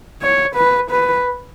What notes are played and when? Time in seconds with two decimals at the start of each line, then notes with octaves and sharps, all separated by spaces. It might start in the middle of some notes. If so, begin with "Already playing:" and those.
0.21 C#5
0.56 B4
0.90 B4